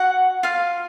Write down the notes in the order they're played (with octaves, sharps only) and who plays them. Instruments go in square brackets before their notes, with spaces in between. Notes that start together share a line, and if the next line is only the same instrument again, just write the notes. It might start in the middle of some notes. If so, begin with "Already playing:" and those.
Already playing: [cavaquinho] F#4 F#5
F4 F5